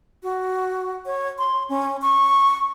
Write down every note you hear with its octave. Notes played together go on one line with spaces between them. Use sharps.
F#4
C#5
C6
C#4
C#6